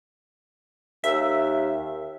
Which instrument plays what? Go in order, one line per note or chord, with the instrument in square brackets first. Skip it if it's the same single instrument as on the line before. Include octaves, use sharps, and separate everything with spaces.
[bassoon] D#2 [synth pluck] E5